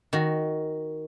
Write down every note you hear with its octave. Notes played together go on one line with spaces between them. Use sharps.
D#3 F#4